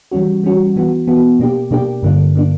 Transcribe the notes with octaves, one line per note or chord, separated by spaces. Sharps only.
E3 G3 C#4 F#4
E3 G3 C#4 F#4
E3 B3 F#4
E3 B3 F#4
B2 A#3 D4 G4
B2 A#3 D4 G4
G2 D3 A#3 D4
D3 A#3 D4